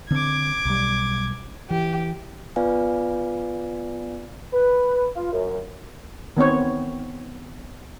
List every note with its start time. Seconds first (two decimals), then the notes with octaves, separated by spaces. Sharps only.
0.11 D3 C4 D6 G#6
0.65 B1 G3
1.70 E3 G4
2.56 B3 F4 B4 D5 F5 G#5
4.53 B4
5.15 F4
5.32 F#2
6.37 D#3 B3 C4 C#5